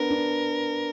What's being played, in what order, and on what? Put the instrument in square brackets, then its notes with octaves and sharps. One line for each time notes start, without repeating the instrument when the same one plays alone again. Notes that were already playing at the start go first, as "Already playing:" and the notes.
Already playing: [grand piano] B3 D4 [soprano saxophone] A#4
[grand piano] D4